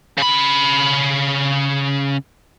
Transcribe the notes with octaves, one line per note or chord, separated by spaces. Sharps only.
C#3 B5